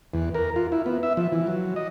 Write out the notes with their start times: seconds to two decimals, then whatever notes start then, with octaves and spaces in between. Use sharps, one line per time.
0.14 E2
0.34 A#4
0.56 F4
0.72 E4
0.86 B3
1.03 E5
1.17 F3
1.32 E3
1.47 F#3
1.76 D#5